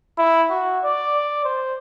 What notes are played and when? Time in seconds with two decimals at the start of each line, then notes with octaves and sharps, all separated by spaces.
0.18 E4
0.50 F#4
0.84 D5
1.45 C5